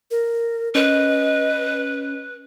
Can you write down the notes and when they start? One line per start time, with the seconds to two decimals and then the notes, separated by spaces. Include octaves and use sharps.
0.11 A#4
0.75 C#4 B4 D#5